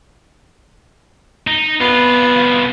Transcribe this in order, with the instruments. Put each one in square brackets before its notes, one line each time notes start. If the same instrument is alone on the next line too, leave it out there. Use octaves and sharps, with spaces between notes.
[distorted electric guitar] D#4
[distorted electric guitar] C2 F4 [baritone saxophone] B3